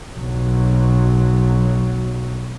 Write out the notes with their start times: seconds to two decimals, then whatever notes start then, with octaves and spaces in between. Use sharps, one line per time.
0.16 B1 F#3